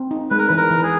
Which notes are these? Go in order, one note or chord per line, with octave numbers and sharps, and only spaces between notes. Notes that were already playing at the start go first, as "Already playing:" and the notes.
Already playing: C4
D#4
G#3 B4
A#4
E3 B4
A#4
E3
G#4